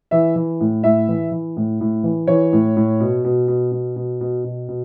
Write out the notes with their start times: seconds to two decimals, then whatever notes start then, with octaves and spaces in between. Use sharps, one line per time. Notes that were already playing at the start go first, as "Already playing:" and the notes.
0.11 E3 E5
0.36 E3
0.61 A2
0.84 A2 E5
1.08 E3
1.32 E3
1.57 A2
1.81 A2
2.04 E3
2.27 E3 C#5
2.53 A2
2.77 A2
3.00 B2
3.25 B2
3.48 B2
3.72 B2
3.96 B2
4.21 B2
4.44 B2
4.69 B2